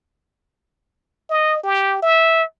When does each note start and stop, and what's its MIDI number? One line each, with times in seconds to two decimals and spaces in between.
1.30 1.58 75
1.63 1.99 67
2.02 2.43 76